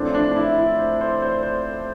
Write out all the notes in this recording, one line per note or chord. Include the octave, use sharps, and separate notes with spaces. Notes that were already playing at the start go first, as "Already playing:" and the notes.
Already playing: A2 F3 A3 C4 D4
D4
D4
E4
E4
C5
C5
C5
C5